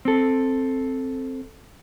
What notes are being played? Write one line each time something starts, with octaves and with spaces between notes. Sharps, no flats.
C4 A4